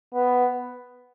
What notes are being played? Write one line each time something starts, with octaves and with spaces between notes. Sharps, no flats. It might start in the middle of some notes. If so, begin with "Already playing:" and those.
B3